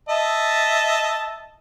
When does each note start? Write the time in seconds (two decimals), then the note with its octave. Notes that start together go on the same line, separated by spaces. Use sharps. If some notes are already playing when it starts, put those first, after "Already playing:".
0.09 D#5 E5 A5